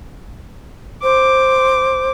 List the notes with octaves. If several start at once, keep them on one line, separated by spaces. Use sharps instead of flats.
C5 D6